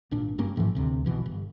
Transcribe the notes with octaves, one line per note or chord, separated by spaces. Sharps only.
G#1 A#2 D4
F#1 G2 A#3 C#4
A1 G#2 E3 F3
D#1 D2 C3
A#1 B2 E3
G1